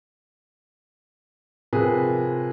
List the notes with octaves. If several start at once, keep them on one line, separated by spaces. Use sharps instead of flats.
C3 F3 G#4 A#4 B4